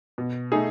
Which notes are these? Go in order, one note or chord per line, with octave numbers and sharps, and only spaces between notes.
B2
A3 D#4 G#4